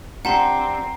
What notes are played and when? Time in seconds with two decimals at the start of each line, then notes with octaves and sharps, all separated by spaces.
0.25 C4 D4 F4 G4 F#5 A5 A#5 C6